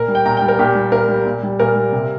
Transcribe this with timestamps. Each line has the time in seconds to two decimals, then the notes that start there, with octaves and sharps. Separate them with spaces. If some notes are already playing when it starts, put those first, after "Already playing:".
Already playing: A#2 A#4
0.08 G3
0.15 G5
0.26 A#2 A#5
0.37 G3 G5
0.48 A#4
0.59 A#2 G4
0.75 G3
0.92 A#2 A#4
1.09 G3
1.26 A#2
1.43 G3
1.59 A#2 A#4
1.76 G3
1.92 C3